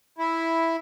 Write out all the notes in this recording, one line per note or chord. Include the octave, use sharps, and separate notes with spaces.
E4